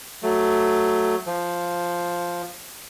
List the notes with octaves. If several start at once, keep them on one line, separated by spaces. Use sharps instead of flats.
F#3 A3
F3